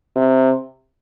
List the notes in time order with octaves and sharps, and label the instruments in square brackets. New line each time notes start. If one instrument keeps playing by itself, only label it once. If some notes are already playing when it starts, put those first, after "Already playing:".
[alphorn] C3